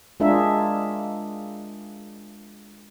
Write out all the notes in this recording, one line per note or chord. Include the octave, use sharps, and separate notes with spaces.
G#3 D4 F4 G#4 A#4 E5